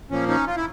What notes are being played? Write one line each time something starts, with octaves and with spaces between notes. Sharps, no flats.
A#2 F3 A#3 C#4
C#4 D#4
F4
E4